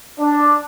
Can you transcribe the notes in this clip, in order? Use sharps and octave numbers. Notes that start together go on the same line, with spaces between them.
D4